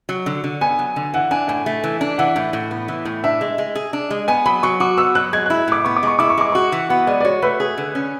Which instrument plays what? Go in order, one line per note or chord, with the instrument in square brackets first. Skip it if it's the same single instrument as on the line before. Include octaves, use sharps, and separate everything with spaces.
[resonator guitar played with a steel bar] F#3
D3
D3
[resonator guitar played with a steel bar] B3 [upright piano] G#5
[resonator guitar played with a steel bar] F#3
D3
[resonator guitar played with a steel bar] E3 [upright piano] F#5
[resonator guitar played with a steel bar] D4 [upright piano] G#5
[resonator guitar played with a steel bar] A2 [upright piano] G#5
[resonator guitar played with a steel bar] A3
E3
D4
[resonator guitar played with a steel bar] E3 [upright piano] F#5
[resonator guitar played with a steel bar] A2
A2
B3
E3
A2
[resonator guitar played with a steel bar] D4 [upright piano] E5
[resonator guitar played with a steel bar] G#3
G#3
G#4
D4
G#3
[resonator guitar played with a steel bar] B3 [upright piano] G#5
[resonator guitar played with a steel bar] F#3 [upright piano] B5
[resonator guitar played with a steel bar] F#3 [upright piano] C#6
[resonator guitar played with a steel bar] F#4 [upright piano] D6
[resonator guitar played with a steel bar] B3 [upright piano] E6
[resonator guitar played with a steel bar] F#3 [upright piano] F#6
[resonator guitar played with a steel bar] G#3 [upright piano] G#6
[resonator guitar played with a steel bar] E4 [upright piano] F#6
[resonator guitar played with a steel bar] A2 [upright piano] D6
[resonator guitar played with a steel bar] B3 [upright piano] C#6
[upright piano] D6
[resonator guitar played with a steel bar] G#3 [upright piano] C#6
[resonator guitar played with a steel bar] E4 [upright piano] D6
[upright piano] C#6
[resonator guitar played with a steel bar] G#3 [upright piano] D6
[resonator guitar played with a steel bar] F#4 [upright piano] C#6
[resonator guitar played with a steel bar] E3
[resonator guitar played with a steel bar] B3 [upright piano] F#5
[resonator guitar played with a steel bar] G#3 [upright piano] D5
[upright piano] D5
[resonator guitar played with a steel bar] F#4 [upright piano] C#5
[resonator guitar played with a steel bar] A3 [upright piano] B4
[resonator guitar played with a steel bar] G#4
D3
C#4